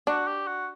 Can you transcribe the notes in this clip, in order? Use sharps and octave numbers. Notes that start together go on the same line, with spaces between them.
D4 F#4
G4
F#4